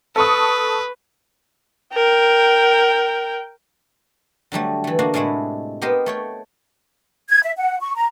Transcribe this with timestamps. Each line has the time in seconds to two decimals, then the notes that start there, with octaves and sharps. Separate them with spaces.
0.16 A4 B4 C#6 D#6
1.94 A#4 G5
4.52 D3 F#3 G3 A3
4.84 E3 A3
4.99 D3 A#3 D4 F#4
5.14 A2 C3 G#3 A3 E4
5.81 B3 G4 A#4 C5 D#5
6.06 A3 C#5 G5
7.29 G#6
7.43 E5
7.57 F#5
7.80 C#6
7.96 A#5